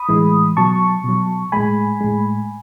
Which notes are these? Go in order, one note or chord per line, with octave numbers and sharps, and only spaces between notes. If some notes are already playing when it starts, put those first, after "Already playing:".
Already playing: B5 D#6
A2 E3 G#3
B2 F#3 A5 C#6
B2 F#3
A2 G#3 G#5 B5
A2 G#3